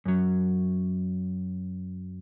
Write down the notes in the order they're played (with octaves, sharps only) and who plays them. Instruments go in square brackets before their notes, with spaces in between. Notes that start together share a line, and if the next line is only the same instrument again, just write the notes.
[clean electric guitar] F#2 F#3